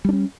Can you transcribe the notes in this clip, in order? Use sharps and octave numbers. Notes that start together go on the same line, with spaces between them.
G3 C#4 D4